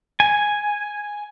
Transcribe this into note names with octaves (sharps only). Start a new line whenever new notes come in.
G#5